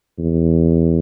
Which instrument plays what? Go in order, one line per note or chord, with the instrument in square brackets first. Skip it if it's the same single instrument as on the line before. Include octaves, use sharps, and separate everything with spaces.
[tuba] E2